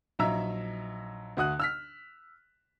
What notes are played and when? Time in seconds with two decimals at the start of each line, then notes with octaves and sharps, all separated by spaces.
0.19 A#1 F#3 D#4 E5 A#5 E6
1.37 D2 F#4 D#6 F#6
1.60 E6 F6 B6